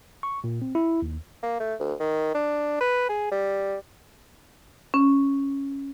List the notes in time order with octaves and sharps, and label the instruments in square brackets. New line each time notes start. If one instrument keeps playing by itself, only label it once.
[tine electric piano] C#6
A#2
C4
E4
D#2
[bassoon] A#3
A3
D2
D#3
D4
B4
G#4
G3
[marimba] C#4